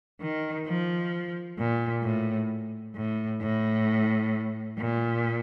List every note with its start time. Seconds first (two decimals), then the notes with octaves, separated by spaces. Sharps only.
0.21 D#3
0.67 F3
1.59 A#2
2.03 A2
2.96 A2
3.41 A2
4.78 A#2